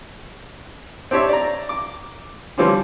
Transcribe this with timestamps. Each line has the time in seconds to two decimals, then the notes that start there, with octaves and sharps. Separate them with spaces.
1.11 C4 D4 G4 C#5 E5
1.29 D5 A#5
1.69 D6
2.58 D3 E3 F3 G3 C4 C#4